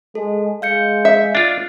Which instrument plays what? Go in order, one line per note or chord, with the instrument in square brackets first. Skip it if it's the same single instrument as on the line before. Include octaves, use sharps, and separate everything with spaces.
[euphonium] G#3 [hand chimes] A4
[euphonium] G#3 [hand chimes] F5 G6 C#7
[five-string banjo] E5
[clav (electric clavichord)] D4 F4